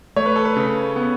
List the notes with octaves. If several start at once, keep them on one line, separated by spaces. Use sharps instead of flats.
A3 C#5
B4
A4
B4
C#3
B3